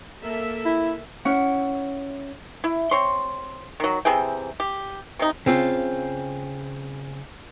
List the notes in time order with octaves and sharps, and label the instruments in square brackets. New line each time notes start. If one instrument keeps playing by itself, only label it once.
[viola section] A#3 A4 E5
[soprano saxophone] E4
[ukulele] C#4 E4 F#5
[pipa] E4
C4 C#5 C6
D#3 F#3
C3 E3 G#4 G5
G4
C3 D#4
[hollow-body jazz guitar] C#3 C4 F4